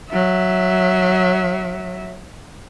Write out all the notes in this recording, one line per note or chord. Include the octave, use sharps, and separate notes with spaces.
F#3 E5